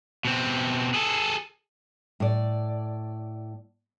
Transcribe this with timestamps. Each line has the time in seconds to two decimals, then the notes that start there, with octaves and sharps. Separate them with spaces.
0.25 B2 C4
0.94 G#4 A4
2.20 A2 D5